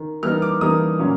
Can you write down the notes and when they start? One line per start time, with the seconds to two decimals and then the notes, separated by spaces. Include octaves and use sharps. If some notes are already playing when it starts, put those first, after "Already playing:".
Already playing: D#3
0.23 E3 G3 A#3 D#4 F6
0.42 D6
0.61 E3 G3 A#3 D#4 D#6
0.99 A#2 F#3 A#3 C#4